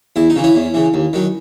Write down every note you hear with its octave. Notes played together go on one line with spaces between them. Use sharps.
E2 E4
D#4
C#3 E3
C#4 E4
E2
C#3 E3
D#2
D#3 F#3